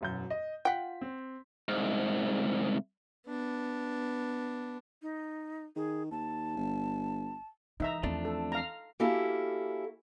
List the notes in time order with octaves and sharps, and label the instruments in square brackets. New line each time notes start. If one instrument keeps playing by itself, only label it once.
[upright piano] E1 F#2 G6
D#5
[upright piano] F4 B6 [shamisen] F#5 G5
[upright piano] C4
[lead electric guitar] C2 G#2
[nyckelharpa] B3 D4
[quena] D#4
[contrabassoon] D#3 [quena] G#4
[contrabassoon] D#2 [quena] A5
[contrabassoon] G1
[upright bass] E3 [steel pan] D#4 E5 A#5
[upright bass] E2 C4 [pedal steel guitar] F3 A3 D4
[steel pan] A4
F5 A#5
[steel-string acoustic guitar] A#3 C#4 E4 F#4 G4 A4